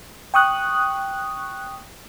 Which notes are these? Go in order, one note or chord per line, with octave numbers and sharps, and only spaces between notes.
G5 C#6 D#6 F#6